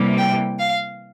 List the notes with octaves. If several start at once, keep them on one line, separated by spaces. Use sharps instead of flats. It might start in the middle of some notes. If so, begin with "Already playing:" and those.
Already playing: C3 E3 G3 A#3
G5
F5